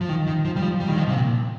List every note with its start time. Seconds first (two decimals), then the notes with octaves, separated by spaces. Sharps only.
0.01 F3
0.09 D#3
0.27 D#3
0.45 F3
0.56 G3
0.62 F3
0.80 G3
0.88 D#3
0.97 F3
1.08 C3
1.14 A#2